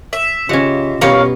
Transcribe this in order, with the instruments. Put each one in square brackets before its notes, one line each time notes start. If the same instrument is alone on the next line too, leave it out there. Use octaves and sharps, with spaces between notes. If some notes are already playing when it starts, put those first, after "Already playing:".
[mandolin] E5
[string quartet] C#3 [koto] C#4 F#5 [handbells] F4 G4 D#5
[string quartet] B2 B3 [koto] G3 C#4 [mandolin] A#4 C#5 F5